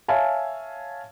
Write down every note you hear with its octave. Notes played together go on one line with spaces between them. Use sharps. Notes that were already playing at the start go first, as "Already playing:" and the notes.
C#5 E5 F5 G#5 A5